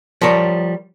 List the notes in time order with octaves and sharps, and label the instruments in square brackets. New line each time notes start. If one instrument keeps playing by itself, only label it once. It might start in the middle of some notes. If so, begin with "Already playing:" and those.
[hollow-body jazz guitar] F3 G3 A#4 C#5